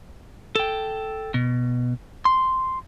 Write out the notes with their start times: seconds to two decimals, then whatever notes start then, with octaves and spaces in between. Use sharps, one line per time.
0.56 A4 G5
1.34 B2
2.25 C6